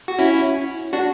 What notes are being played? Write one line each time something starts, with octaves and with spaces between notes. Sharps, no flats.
F#4
C#4 E4
D4 F#4